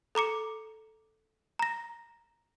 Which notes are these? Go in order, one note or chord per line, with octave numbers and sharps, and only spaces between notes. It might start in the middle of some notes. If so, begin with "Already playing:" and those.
A4 A#5 D6 C#7
A#5 A#6